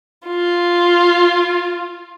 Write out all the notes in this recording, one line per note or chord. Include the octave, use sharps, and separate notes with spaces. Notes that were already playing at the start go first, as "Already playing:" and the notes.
F4